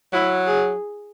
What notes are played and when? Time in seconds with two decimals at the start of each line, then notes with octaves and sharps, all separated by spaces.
0.13 F#3 E4
0.47 G#4